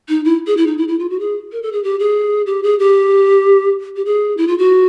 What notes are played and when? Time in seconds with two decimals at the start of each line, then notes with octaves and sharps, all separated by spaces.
0.09 D#4
0.25 E4
0.47 G#4
0.57 E4
0.67 D#4
0.78 E4
0.88 E4
0.99 F4
1.10 F#4
1.20 G#4
1.52 A#4
1.63 A4
1.72 G#4
1.84 G4
1.99 G#4
2.46 G4
2.63 G#4
2.79 G4
3.96 G4
4.05 G#4
4.37 E4
4.48 F4
4.58 F#4